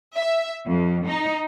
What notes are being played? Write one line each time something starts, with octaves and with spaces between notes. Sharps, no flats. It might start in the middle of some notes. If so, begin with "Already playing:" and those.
E5
F2
D#4